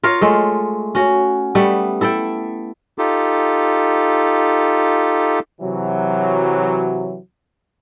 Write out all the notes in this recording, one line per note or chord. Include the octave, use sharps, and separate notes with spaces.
F4 A#4 C#5 F5
G#3 A3
C#4 F#4
G3 A3 B3 F#5
E4 A4 E5 G5
D#4 F4 G4 A4
C3 E3 F#3